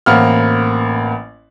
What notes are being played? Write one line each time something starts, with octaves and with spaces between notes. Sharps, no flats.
A1 A#3 C4 F#5 B5 F6